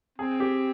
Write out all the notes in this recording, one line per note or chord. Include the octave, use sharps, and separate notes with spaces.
C4 G#4
G4